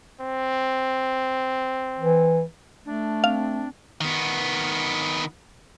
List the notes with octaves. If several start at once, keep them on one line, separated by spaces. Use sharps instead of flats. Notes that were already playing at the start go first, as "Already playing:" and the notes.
C4
E3
A3 D4
C4 F5
D#3 B3